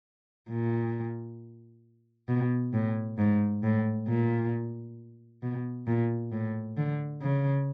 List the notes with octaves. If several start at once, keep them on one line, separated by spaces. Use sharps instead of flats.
A#2
B2
A2
G#2
A2
A#2
B2
A#2
A2
D3
C#3